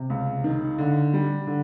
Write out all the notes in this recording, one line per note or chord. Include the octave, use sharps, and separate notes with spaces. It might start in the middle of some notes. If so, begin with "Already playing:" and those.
Already playing: C3
C#2
D#3
D3
G3
D3